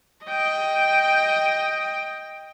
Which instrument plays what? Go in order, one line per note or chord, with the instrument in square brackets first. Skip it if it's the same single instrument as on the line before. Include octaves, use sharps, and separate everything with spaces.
[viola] D#5 G5